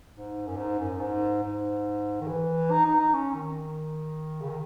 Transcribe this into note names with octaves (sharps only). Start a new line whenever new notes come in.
G#2
F#2
G#2
F#2
G#2
G#2
D#3
E3
D#4
D#4
D#4
C#4
D#3
C#3
D#3